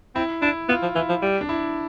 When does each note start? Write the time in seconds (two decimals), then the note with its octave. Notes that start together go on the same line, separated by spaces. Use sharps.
0.15 C4 E4
0.42 D4 E4
0.69 B3 F4
0.82 F3
0.95 E3 E4
1.09 F3
1.22 G3
1.41 D4
1.49 E4